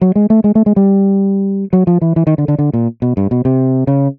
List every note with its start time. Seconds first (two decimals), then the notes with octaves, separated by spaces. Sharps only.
0.01 F#3
0.16 G#3
0.30 A3
0.44 G#3
0.55 A3
0.66 G#3
0.76 G3
1.73 F#3
1.87 F3
2.02 E3
2.16 E3
2.27 D#3
2.38 D3
2.48 D3
2.59 D3
2.74 A#2
3.02 B2
3.17 G2
3.31 B2
3.45 C3
3.87 C#3